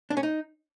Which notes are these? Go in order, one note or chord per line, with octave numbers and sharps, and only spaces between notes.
D4
C#4
D#4